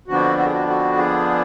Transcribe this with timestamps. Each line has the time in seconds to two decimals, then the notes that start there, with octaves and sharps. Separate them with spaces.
0.08 F2 D3 F3 B3 D4 F#4
0.38 F#4
0.45 G#4
0.53 F#4
0.68 F#4
0.98 G#4